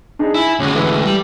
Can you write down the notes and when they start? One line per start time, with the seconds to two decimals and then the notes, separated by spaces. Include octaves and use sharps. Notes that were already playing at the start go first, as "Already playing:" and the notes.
0.19 D4 D#4 G#4
0.34 E4 G#5
0.59 D2 G#3 C#4
0.75 E3 A4 B4
1.05 G3